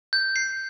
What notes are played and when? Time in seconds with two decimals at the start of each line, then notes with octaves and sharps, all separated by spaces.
0.13 G6
0.36 C7